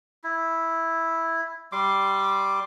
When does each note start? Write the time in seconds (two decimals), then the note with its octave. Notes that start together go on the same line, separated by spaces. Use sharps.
0.24 E4
1.72 G3 C6 D6